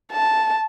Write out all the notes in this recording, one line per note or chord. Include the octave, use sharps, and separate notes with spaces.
A5